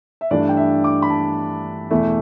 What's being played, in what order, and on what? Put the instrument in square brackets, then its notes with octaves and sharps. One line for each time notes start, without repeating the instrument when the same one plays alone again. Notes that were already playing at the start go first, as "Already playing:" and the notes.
[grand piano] E5
G2 E3 A3 D4 D5
G5
E5
D6
B5
A5
E2 B2 A3 E4